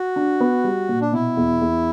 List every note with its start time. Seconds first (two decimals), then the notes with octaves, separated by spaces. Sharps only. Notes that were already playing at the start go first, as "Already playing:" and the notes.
Already playing: F#4
0.16 D4
0.40 B3
0.64 G3
0.89 A#2
1.01 D4
1.12 B2 E4
1.37 E2
1.61 E2